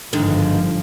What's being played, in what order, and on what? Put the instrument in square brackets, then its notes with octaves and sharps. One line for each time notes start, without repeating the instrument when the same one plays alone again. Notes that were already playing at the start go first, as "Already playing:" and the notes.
[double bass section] G1 F3 [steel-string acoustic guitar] G#2 D3 D#3